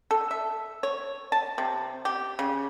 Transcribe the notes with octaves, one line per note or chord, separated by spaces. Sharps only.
A4
E5
C#5
A5
C3
G4
C#3